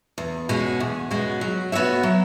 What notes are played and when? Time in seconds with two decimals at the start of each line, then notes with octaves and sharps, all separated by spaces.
0.18 E2
0.49 B2 G#3 C#4 F#4
0.80 E2
1.11 B2 G#3 C#4 F#4
1.41 F#3
1.72 B3 F#4 C#5 E5
2.03 F#3